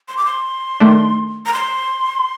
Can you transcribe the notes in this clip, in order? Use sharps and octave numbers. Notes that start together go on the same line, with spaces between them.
C6
D6
C6
D#3 A3 D4
A#5
C6